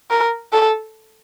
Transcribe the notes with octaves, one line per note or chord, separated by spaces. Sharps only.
A#4
A4